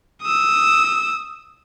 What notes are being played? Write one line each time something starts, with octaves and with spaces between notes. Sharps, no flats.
D#6 E6